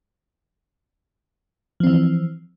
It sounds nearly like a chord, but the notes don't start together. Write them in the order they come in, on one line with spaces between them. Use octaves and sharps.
F3 C4 E3